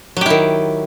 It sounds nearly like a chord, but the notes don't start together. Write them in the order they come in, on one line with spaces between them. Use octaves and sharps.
F#3 G4 E4 D#3